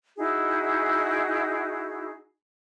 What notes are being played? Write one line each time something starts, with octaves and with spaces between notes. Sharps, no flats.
D#4 E4 F#4 G#4